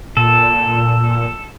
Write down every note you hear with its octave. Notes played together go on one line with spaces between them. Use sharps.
A#2 A4